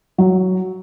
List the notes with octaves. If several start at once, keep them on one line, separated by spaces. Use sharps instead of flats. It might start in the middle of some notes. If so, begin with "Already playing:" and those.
F#3